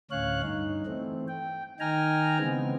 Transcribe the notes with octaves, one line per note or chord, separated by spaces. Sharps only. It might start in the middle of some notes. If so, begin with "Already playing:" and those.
D2 A2 C#4 C#5 F5 F#6
G2 D#4
E3 A3 C4
G5
D#3 D#4 G5 G#5 A#5 F6
C#3 E3 G#3 B3 C4